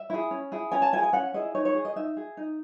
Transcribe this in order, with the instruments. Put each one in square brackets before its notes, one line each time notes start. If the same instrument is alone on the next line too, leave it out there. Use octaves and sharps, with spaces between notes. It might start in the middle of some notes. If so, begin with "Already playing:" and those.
Already playing: [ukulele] E5
E4 G#4
C#4
E4 G#4
C#4 G#5
A5
E4 G#5
G#4
G#5
C#4 F#5
E4 G#4 D#5
D#4 C#5
C#5
G#4
D#5
D#4 E5
G#4
D#4